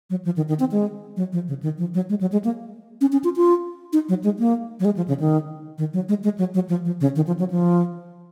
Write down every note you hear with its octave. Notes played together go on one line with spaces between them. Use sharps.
F#3
F3
D#3
D#3
C4
G#3
F#3
F3
C#3
D#3
F3
F#3
G#3
F#3
G#3
A#3
C#4
C#4
F4
F4
D#4
F#3
G#3
A#3
F#3
G#3
F3
C#3
D#3
D#3
F#3
G#3
G#3
F#3
F#3
F3
F3
C#3
D#3
F3
F#3
F3